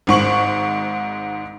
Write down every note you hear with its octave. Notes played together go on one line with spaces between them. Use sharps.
G#1 G#2 C#6 F#7